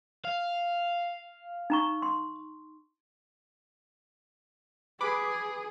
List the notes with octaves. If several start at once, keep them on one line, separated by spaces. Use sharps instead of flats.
F5
D#4 A#5 C#6
C6
G#4 B4 B5 D6